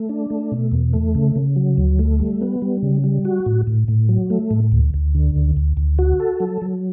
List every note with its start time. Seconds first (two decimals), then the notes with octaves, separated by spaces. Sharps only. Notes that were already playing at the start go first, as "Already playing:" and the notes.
Already playing: A3
0.09 D4
0.30 A3
0.52 B2
0.72 E2
0.93 A3
1.15 C#3
1.36 C#3
1.56 F#3
1.78 D2
1.99 A3
2.20 G3
2.41 B3
2.62 G3
2.83 C#3
3.04 G3
3.25 F#4
3.46 A2
3.67 A2
3.88 A2
4.09 F#3
4.30 A3
4.51 A2
4.72 D2
4.94 D2
5.15 D3
5.36 D2
5.57 D2
5.77 D2
5.99 F#4
6.20 A4
6.40 F#3
6.62 F#3